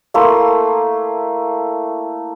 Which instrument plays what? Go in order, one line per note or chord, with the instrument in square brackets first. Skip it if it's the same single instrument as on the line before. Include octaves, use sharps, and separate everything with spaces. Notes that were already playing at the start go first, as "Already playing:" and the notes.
[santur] A3 A#3 E4 C6